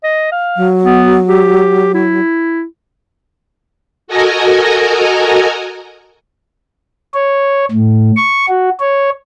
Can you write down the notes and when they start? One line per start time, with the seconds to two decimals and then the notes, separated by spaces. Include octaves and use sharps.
0.04 D#5
0.32 F5
0.57 F#3
0.85 B3
1.28 G4
1.94 E4
4.08 F#4 A4 A#4 D#5 G#5 A#5
7.14 C#5
7.71 A2
8.17 C#6
8.49 F#4
8.80 C#5